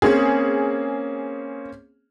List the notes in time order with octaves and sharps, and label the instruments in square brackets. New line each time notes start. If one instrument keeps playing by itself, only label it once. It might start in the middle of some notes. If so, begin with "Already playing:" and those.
[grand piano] A#3 C4 C#4 [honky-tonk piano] G#4